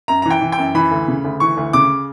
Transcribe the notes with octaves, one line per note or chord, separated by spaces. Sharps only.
F#2 A#5
E3 A#5
G5
E3
G5
F#2
E3 B5
D2
C#3
D2
E3 C#6
D2
C#3 D6